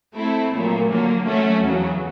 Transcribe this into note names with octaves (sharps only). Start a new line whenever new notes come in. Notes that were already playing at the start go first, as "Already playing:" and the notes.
A3 C4 E4 A4
A#2 F#3 A3
D3 F#3 A#3
F#3 A3 C#4 F#4
E2 C#3 F#3